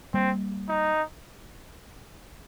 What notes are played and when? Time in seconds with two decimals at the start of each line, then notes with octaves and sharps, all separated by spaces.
0.14 G3 A#3 C4
0.69 D#4